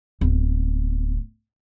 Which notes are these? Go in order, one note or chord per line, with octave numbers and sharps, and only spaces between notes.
D1 B3